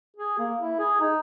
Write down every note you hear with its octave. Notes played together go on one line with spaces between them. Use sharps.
G#4
A#3
E4
G#4
D#4